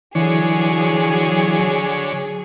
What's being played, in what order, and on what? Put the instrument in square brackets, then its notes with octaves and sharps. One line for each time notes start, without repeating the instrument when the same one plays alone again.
[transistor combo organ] D3 C#5 [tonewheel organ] E3 [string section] F#3 G#4